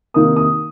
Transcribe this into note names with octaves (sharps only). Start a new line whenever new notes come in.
C3 D#3 A#3 D#4 D#6
D#6